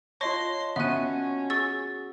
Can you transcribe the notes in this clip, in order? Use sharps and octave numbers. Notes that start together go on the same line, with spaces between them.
F4 C#5 D#5 A5 C6 C#6 A#6
B3 C#4 F#4 E5 F#6 D#7
G#4 C#6 E6 A6